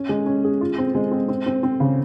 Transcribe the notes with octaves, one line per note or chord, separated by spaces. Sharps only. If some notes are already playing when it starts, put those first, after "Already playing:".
Already playing: C#4
G#3
C#4
G#4
F4
C4
G#3
C4
C4
C4
C4
C#3